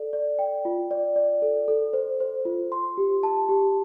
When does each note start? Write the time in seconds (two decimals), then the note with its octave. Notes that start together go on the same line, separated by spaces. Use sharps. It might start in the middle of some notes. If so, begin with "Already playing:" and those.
Already playing: A4 D5
0.13 D5
0.39 G5
0.65 F4
0.91 D5
1.16 D5
1.42 A4
1.68 A4
1.93 C5
2.20 C5
2.45 F4
2.72 C6
2.98 G4
3.23 A5
3.49 G4